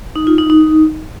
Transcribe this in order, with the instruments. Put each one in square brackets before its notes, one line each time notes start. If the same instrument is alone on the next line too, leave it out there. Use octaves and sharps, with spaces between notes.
[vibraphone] D#4
F4
D#4
D#4